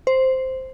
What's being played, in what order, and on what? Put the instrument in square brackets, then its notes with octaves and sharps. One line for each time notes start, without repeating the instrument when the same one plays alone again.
[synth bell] C5